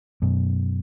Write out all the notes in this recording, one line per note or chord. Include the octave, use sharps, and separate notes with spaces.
F#2 B2